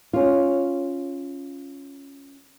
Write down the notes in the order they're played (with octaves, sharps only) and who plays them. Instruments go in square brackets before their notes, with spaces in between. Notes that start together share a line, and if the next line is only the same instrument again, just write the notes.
[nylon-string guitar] C#4 F4